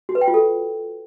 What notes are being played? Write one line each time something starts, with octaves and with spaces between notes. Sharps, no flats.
F#4
B4
G5
F4
A4